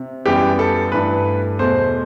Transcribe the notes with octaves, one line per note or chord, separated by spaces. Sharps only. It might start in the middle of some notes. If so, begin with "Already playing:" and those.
Already playing: C3
F#2 E3 G3 B3 G4
A4
G2 E3 A3 B4
E2 B2 A3 C5